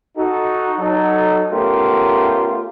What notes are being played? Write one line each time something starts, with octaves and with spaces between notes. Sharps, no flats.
D#4 F#4 A4
F#3 D#4 A4
A3 B3 C#4 F4 G4 A#4